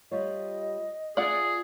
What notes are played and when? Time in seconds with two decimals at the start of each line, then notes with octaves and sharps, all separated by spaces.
0.11 G3 F4 C#5 D#5
1.17 F4 G#4 D5 E5 F#5